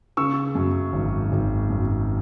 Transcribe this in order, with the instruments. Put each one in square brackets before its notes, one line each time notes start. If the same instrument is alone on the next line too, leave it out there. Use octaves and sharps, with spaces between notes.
[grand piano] C#3 C#6 E6
F#2
G#1
G#1
F#2